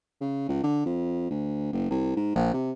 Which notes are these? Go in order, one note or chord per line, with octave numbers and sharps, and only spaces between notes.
C#3
C#2
D3
F2
D2
F#1
C2
G#2
A#1
C3